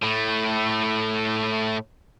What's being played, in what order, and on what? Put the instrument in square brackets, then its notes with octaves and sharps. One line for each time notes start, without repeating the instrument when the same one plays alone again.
[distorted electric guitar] A2 A3